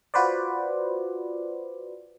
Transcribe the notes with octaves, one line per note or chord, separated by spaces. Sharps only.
F4 F#4 B4 C5 D5